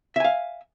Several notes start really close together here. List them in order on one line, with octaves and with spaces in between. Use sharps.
E5 G#5 F5